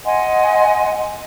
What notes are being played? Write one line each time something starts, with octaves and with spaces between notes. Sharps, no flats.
D#5 F#5 G#5 C6